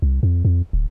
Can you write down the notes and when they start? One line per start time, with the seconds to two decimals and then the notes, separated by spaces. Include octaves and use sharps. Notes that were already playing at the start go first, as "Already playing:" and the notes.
0.02 C2
0.23 F2
0.45 F2
0.73 D1